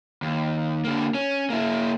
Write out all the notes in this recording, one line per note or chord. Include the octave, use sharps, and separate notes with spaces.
D#2
D3 A#3
C#4
A#3 E4